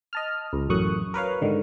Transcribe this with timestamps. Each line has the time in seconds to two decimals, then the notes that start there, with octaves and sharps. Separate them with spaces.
0.13 D#5 A5 F6
0.53 C#2
0.69 A1 F#2 A2 C#6 D#6 F#6
1.14 A#4 B4 C#5 F5
1.42 G#2 D3 D#3